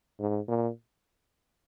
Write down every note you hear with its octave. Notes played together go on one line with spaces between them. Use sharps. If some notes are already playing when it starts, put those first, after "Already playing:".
G#2
A#2